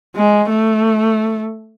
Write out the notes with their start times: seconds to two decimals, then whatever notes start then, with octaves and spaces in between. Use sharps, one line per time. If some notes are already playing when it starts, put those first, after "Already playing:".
0.16 G#3
0.49 A3